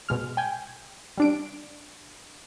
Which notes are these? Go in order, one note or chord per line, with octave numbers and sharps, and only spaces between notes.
B2 G#3 F6
G5 G#5
G3 D4 D7